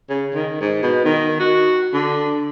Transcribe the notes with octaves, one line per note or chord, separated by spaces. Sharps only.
C#3
D#3
G#2
B2
D#3
F#4
D3